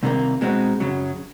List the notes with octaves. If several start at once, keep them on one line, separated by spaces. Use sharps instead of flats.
C2 C3 D#3 G3 A#3
B2 G#3 C4 D#4 F#4
F#2 C#3 F#3